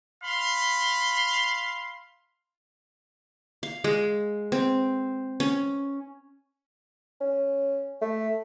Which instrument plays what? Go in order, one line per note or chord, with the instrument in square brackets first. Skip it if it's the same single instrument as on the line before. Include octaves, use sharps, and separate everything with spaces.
[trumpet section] F5 B5 C6
[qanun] F5
G#3
C4
C#4
[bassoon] C#4
A3